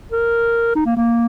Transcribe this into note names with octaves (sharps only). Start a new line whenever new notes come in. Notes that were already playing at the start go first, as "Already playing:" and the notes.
A#4
D#4
A#3
A#3